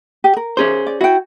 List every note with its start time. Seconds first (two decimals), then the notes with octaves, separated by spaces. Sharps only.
0.24 G4
0.37 A#4
0.57 C#4 G#4 C5
0.87 D5
1.01 E4 F#4 G5